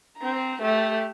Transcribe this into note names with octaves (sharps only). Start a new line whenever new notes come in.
C4 A#5
A3 G4